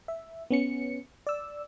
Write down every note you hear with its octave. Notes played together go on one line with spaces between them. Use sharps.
E5
B3 C#4 C#7
D5 E6